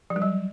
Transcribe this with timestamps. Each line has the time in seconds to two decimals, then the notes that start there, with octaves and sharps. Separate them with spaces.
0.10 F3
0.16 G3
0.22 F#3